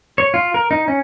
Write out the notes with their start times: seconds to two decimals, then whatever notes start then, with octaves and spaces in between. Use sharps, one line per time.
0.18 C#5
0.34 F4
0.54 A#4
0.71 D#4
0.88 C#4